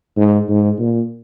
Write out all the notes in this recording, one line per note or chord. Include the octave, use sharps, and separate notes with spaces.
G#2
G#2
A#2